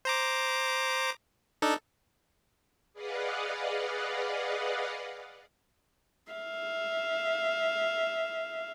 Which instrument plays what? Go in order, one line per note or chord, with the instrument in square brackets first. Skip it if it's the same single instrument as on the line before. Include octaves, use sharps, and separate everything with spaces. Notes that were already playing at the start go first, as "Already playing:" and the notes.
[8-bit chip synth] C5 A#5 D6
D4 D#4 A4
[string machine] G#4 B4 D5 D#5 F5 F#5
[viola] E5 F5